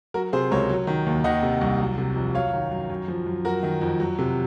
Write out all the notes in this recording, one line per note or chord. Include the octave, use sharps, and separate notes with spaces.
F#3 F#4 A#4
C3 G#4 C5
C#2 A#4 C#5
F#3
D#3
D#2
D#3 D#5 F#5
C3
C2
F#3
C3
F2
F#3 C#5 F5
D#3
F#2
F#2
F3
F#2
F#3 F#4 A#4
D#3
F2
F#3
C3